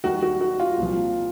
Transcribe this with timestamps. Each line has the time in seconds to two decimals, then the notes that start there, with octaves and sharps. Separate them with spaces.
0.04 D#2 D#3 G3 F#4
0.22 F#4
0.41 F#4
0.60 F4
0.78 C2 A#2 F3